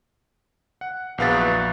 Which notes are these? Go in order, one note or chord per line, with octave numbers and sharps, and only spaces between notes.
F#5
A#1 E2 F#3 B3 F5 A6